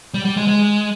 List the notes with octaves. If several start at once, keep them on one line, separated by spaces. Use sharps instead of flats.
G3
G3
G#3
G#3